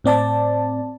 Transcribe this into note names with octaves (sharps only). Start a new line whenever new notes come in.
A2 C4 D5 A5